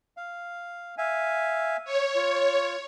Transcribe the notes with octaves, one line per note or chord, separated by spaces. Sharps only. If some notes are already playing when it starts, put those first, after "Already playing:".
F5
E5 F5 G#5
C#5
F4